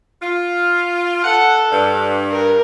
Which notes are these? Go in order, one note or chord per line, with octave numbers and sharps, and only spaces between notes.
F4
A4 F#5
G2
A#4